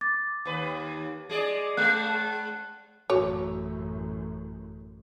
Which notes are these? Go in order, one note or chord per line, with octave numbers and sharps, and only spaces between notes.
D6 A6
D#2 B4
G#3 G#4 D5
G#3 F#6
A1 F#2 F#4 C#5